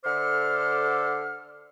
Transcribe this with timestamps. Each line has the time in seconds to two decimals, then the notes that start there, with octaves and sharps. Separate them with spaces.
0.05 D3 A4 C5 E5 D6 F6